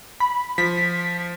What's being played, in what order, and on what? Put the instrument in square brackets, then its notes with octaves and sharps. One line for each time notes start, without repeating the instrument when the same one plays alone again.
[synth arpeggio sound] B5
[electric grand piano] F3 [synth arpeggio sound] B6